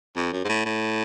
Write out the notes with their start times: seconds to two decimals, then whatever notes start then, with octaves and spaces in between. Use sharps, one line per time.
0.17 F2
0.33 F#2
0.44 G#2
0.49 A2
0.66 A2